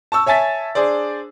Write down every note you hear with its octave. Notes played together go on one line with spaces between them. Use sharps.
A5 C#6 E6
C#5 E5 G#5 A5 A6 B6
D4 G#4 C5 D5